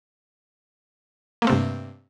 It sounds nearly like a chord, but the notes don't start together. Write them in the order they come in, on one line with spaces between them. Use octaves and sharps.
A#3 A3 C4 C3 G2